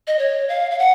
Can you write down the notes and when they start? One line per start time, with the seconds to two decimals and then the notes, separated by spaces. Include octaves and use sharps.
0.07 D#5
0.19 C#5
0.49 F5
0.71 F5
0.79 F#5